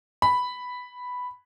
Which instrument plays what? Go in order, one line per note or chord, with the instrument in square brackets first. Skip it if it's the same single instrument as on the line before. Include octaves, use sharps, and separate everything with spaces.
[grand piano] B5